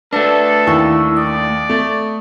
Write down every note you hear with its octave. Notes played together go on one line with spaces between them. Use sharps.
A3 D4 A4 B4 D5
D#2 E4 C#6 E6
D5 D#6
A3